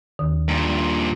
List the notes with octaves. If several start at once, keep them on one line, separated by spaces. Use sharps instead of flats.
D#2 D#3
G2 A#2